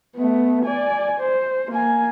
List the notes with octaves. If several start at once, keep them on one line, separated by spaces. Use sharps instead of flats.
A3 B3
D5 G#5
C5
A#3 G#5